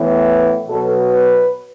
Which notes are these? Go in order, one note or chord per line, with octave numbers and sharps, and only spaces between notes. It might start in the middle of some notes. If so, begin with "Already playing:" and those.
Already playing: A2 E3 B3
B2 F#3 B3 A4
B4